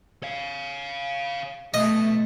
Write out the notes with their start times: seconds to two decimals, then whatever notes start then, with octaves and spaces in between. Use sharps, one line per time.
0.23 C#5 F5
1.74 B2 A3 D#5